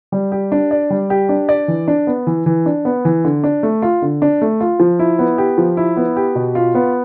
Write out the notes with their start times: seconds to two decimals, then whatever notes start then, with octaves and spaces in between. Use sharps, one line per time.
0.12 G3
0.32 G4
0.52 D4
0.71 D5
0.90 G3
1.10 G4
1.29 D4
1.49 D5
1.68 E3
1.88 D4
2.07 B3
2.27 E3
2.46 E3
2.66 D4
2.85 B3
3.05 E3
3.24 D3
3.44 D4
3.63 A3
3.82 F4
4.02 D3
4.22 D4
4.42 A3
4.60 F4
4.80 F3
4.99 E4
5.19 B3
5.38 G4
5.58 F3
5.77 E4
5.97 B3
6.16 G4
6.35 B2
6.55 F4
6.75 B3